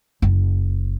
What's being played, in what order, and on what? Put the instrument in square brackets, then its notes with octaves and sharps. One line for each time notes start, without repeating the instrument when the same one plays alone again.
[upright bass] F#1